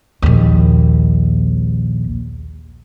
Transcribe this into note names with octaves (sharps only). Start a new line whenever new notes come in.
A#1 D#2